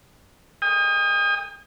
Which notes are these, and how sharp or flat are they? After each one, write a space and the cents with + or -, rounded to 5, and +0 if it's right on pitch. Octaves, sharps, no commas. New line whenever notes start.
G5 +45 D#6 +0